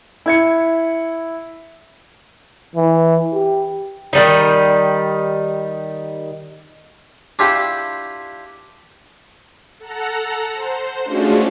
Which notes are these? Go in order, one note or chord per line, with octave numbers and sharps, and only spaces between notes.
E4 G#6 C#7
E3
G4
D#3 G3 D#4
D4 E4 F4 G4 F#5 G5
A4 F#5 A#5
C5
G#3 A3 C#4 D4 F4 F#4